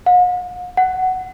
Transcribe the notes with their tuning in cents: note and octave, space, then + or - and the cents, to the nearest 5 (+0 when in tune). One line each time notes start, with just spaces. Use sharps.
F#5 -45
F#5 +10